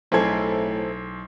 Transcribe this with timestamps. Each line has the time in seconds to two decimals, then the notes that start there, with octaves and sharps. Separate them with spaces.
0.12 B1 A2 C4 E4 G#4 A4 G#6